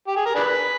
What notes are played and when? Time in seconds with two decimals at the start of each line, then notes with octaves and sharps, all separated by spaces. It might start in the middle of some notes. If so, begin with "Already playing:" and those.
0.07 G4
0.16 G#4
0.26 A#4
0.35 D4 G#4 B4